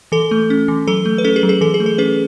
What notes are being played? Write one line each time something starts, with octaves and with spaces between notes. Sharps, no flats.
E3 A4
A3
C#4
E3
F#3 A4
A3
B4
C#4 A4
G#4
F#3
G#4
E3 A4
G#4
A3
A4
C#4 G#4 B4